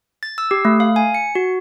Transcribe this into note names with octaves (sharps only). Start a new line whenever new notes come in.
A6
E6
G4
A3
F5
G#5
C#7
F#4